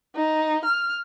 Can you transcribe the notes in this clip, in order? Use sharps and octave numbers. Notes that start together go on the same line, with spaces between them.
D#4
F6